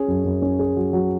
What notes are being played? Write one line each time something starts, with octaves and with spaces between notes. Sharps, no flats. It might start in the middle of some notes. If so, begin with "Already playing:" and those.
Already playing: C#4 G#4
F#2
F#2
C#4
G#4
F#3
F#3